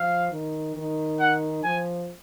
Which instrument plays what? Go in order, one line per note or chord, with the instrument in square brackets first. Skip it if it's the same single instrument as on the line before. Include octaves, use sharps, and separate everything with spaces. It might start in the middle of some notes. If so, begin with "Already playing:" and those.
Already playing: [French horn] F3 [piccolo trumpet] F5
[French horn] D#3
D#3
[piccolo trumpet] F#5
[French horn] F3 [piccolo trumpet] G#5